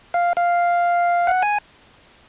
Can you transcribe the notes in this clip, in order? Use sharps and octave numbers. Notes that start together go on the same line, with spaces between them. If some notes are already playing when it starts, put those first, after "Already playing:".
F5
F5
F#5
G#5